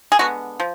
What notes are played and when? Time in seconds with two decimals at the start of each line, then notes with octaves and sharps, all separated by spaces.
0.12 G#4
0.19 D3 G#3 B3 F#4
0.60 F3